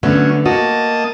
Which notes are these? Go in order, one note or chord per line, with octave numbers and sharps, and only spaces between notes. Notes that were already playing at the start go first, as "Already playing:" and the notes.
D3 F#3 A3 B3 C#4
A#3 F#4 D#5 A5